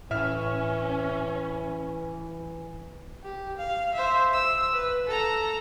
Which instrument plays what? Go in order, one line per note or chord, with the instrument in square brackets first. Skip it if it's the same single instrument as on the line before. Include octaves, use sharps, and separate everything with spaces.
[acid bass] A2 [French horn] E3 [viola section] C#4 [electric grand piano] E5 F6
[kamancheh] G4
F5
C5 E5
E6
B4
A4 A#5